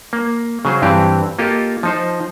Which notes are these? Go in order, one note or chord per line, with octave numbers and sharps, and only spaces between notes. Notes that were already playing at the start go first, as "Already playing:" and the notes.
A#3
C#3 F#3 G#4 C5
G2 E3 C4 G4
A#3 F4 G4 A4 D#5
F3 D#4 C5